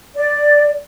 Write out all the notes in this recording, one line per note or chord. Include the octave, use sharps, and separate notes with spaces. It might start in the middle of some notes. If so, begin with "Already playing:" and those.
D5